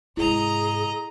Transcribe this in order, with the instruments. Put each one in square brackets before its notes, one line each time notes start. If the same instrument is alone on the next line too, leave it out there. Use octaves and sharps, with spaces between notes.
[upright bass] G#2 C3 [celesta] E4 [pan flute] G#4 [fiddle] D#5 A#5